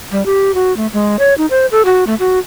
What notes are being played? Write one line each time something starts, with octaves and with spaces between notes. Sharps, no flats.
G3
G4
F#4
A3
G#3
C#5
D#4
C5
A4
F#4
A3
F#4